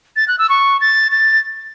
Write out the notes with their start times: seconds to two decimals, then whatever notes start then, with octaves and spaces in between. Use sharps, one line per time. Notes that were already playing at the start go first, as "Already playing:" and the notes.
0.16 A6
0.28 F#6
0.39 E6
0.49 C#6
0.81 A6
1.12 A6